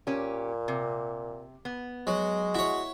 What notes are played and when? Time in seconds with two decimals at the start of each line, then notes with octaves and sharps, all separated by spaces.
0.07 A#2 C#4 G4
0.68 C3
1.65 B3
2.07 F#3 G#3
2.54 E4 F#4 C#5